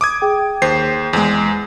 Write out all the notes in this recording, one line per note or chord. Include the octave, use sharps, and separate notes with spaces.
D6 D#6 G#6
G#4 G5
D#2 C5 C7
E2 G#3